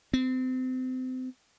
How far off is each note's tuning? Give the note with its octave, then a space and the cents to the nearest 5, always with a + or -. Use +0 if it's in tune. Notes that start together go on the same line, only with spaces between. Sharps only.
C4 -30